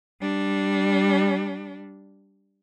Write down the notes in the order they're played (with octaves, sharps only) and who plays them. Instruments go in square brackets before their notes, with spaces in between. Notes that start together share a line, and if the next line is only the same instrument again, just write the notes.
[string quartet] G3 D4